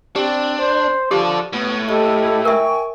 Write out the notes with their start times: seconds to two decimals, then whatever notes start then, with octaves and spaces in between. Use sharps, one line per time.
0.16 C4 D4 G4
0.59 C5
1.11 F3 G4 A4 D5
1.53 A2 B3
1.89 E4 G4 A4 D#5 C#6
2.45 A#4 E5 G5 G#5 C#6